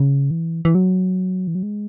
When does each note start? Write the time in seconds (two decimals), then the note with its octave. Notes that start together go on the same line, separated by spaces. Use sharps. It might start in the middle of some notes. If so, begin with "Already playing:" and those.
Already playing: C#3
0.31 E3
0.65 E3
0.75 F#3
1.47 E3
1.55 F#3
1.63 G#3